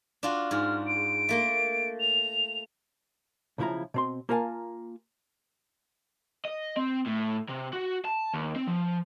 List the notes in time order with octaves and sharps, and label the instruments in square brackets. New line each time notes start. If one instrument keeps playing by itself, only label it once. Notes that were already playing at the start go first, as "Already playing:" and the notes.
[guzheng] D4 F4 F#4
[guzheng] G#2 G#4 [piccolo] F6
[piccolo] D7
[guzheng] A3 A#3 C6
[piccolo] F7
[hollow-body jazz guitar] B1 C#3 F3 E4 F4 A#5
B2 C4 C6
A#3 F4 A#4 F#5 G#5 A5
[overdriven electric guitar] D#5
C4
A2
C3
F#4
A5
D#2
C4
F3